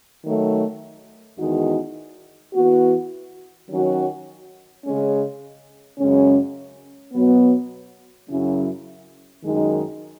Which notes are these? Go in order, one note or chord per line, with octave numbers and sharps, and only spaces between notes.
D#3 F#3 A3
E2 D#3 G#3 D#4 F#4
E3 B3 F#4
D#3 F#3 C#4 F#4
C#3 G#3 C#4
F#2 C#3 G#3 C#4
B2 F#3 B3
F#2 C#3 F#3 C#4 E4
F#2 D#3 G#3 D#4